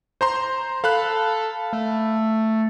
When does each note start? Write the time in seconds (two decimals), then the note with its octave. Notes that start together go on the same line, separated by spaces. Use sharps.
0.21 C5 A#5 C6
0.84 A4 F5 B5 F#6
1.73 A3